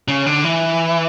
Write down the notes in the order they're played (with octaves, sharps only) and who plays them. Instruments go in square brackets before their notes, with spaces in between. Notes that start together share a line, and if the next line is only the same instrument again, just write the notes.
[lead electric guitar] C#3
D3
E3